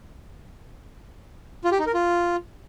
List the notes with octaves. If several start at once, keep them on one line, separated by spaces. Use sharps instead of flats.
F4
G4
D#4
A#4
F4